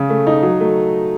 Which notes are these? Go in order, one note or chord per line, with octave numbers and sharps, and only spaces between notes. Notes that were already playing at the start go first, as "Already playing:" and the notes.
Already playing: C#3
A3
D#4
F#3
A3